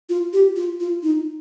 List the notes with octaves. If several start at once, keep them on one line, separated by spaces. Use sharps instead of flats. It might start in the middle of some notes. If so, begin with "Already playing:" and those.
F4
G4
F4
F4
D#4